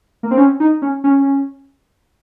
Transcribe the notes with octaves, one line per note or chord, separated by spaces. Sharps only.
A#3
C4
C#4
D#4
C#4
C#4